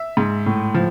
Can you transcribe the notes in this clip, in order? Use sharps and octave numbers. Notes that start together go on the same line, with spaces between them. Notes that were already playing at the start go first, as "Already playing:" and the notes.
Already playing: E5
G#2
A2
F3